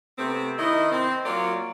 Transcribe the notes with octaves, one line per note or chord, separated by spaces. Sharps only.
C3 A3 B3 C4
D#3 E4 D#5
C4
F#3 A#3 F4 C#5 D5